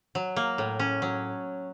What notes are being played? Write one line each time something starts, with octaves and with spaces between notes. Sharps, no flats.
F#3
A#3
A2
C#4
F#3